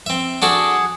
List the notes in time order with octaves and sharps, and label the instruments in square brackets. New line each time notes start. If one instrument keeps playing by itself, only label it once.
[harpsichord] C4 E5
[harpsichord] D4 F#4 A4 [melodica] G#4 F#5